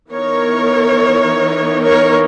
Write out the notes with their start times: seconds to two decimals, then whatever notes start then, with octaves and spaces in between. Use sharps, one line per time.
0.11 E3 B3 D#4 A#4 C#5
1.83 A#4 C#5